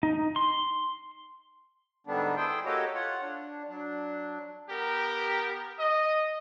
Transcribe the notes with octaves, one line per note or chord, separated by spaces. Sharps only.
D#4
C6
G#2 D3 G3 B3 D4
E4 G#4 C5 G5 C6
A#3 F#4 G4 A4 C#5 D#5
F4 C#5 F#5
D4
F#3 D4
B3 G4 A#4
D#5